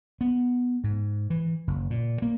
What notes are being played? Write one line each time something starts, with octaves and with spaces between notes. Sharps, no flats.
B3
G#2
E3
F#1
A#2
A#3